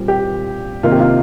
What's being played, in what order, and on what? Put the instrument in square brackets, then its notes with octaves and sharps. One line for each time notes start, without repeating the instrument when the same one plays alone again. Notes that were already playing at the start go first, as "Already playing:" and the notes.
Already playing: [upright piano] A#2 G3 C4
G4
C3 D#3 A#3 F4
G4
F4